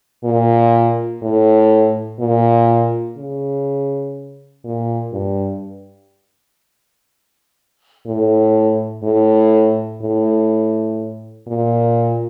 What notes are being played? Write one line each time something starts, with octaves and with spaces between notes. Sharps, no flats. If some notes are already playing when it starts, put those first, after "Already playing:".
A#2
A2
A#2
C#3
A#2
G2
A2
A2
A2
A#2